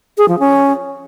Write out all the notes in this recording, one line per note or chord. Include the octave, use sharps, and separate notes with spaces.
G#4
F3
C#4